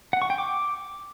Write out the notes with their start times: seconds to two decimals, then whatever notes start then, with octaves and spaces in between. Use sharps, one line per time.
0.13 F#5
0.22 C#6
0.30 G5
0.38 D6